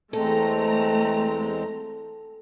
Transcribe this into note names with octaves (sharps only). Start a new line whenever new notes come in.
E2 G#3 A3 C4 A4 A#5